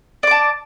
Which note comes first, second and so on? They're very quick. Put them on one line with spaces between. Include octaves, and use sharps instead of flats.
D5 D6 A5